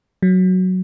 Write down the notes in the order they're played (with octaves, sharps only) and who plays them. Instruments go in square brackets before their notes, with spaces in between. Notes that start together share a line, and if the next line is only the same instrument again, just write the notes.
[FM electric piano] F#3